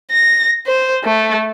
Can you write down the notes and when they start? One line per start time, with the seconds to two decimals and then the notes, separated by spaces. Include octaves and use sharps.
0.11 A#6
0.67 C5
1.04 A3